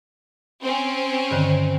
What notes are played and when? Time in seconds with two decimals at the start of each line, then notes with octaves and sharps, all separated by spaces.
0.62 C4 C#4
1.31 G2 D3 D#3